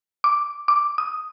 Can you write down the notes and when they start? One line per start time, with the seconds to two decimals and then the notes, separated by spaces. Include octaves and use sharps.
0.24 D6
0.68 D6
0.98 D#6